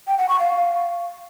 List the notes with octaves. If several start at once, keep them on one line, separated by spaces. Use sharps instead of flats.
G5
F#5
C#6
F5